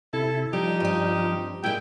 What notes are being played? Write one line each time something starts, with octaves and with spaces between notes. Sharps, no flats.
C3 E4 A4
F3 G3 D#4 G4
G2 C4
A#2 G#3 E4 G5